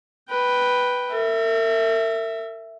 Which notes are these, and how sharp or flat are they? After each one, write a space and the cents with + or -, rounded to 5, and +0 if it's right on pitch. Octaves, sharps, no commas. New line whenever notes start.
B4 +0 G5 +0
A#4 -40 E5 +5